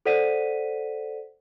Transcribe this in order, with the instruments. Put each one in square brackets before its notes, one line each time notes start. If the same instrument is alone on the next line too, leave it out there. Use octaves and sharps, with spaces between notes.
[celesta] A4 C5 D5 F#5 B6 D#7